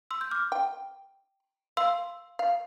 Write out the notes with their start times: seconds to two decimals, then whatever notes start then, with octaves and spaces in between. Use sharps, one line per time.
0.11 C6 E6
0.21 G6
0.31 D6 F6
0.52 G5
1.77 F5 C6 E6
2.39 F5